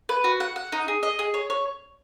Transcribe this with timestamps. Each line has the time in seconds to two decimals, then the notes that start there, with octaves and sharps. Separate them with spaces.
0.09 B4
0.24 F#4
0.40 F#5
0.56 F#5
0.72 D#4
0.88 G#4
1.03 D#5
1.19 G#4
1.34 C#5
1.50 C#5